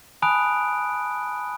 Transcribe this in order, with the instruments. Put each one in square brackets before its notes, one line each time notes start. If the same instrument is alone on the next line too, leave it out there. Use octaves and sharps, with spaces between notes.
[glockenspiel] G#5 A5 B5 D#6 F#6 D7